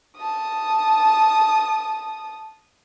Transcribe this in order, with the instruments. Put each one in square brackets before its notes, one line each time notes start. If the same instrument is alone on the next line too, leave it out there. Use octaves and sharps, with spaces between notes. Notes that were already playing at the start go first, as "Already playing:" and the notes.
[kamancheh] A5 D#6